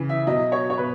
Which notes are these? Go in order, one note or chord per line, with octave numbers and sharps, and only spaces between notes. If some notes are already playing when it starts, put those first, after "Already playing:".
Already playing: C#3 E3
E5
B2 F#3 D#5
C#5
C#5
B2 B4